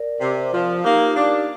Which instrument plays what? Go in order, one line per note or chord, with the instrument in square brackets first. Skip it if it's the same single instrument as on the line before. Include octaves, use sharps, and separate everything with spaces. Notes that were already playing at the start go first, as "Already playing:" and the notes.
Already playing: [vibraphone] A#4 D5
[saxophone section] C3
F3
[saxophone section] A#3 [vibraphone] D#4 G4
[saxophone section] D4